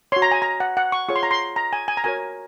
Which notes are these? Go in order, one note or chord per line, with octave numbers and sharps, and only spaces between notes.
F#4 C#5 C6
A#5
G#5
A#5
F#5
F#5
C#6
F4 G#4 C#5 C#6
C6
A#5
C6
A#5
G#5
G#5
A#5
F#4 A#4 C#5 G#5